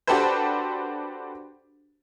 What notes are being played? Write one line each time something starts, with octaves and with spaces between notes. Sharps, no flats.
D4 F#4 G4 A4 B4 C5